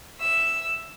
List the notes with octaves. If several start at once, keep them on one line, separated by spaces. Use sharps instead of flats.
E5 E6